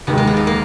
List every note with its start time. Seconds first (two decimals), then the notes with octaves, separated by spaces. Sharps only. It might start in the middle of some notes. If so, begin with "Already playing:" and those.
0.07 D#2 D#3 G#3 B3
0.18 A#3
0.27 B3
0.37 A#3
0.47 A#3